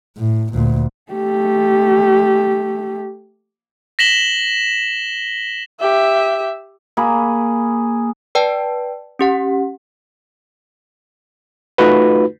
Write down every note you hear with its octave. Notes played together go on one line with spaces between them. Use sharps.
A2
D2 A#2
A3 G4
A#6 B6 E7 F#7 G7
G4 E5
A#3 G#4 B5
B4 D5 G5 A5
C#4 G4 F#5
A3 D#4 F4 F#4 B4